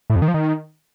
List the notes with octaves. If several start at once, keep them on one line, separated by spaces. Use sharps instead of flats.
A2
F2
D#3
F3
D#3